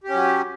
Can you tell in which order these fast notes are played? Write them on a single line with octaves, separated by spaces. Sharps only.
G4 C#4 F#3